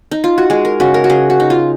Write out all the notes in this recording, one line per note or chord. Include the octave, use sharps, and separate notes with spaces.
D#4
F4
F#4
G#3 G#4
A#4
C#3 F#4
A#4
F#4
C#3 G#4
F#4
D#4
F4